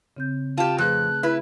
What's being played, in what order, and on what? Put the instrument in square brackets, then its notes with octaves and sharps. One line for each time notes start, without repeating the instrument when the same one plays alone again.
[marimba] C#3 C4 G6
[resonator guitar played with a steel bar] F4 G4 [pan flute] A5
[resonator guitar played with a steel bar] F2 [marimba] A3 G#4 B4 [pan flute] F#6
[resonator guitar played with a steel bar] E4 B4